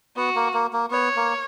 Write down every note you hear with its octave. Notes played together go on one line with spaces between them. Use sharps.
B3 F#4
A#3
A#3
A#3
B3 C#5
A#3